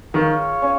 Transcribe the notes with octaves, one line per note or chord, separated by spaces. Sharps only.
D#3 F4 G#4 C#5 F5
C#4